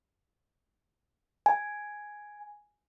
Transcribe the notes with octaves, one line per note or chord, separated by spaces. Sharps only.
G#5